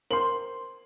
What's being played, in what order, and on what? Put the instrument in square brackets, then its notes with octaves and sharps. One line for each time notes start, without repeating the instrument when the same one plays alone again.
[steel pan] A#4 C5 [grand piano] C6 F#7